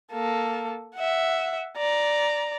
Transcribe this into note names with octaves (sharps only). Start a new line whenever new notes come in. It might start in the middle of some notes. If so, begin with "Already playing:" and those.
A#3 A4
E5 F#5
D5 A#5